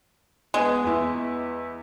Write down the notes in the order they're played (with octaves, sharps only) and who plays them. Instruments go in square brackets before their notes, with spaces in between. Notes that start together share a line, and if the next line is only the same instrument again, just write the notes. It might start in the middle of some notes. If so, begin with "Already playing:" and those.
[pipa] G#3 [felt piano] B3
[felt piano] E2 E4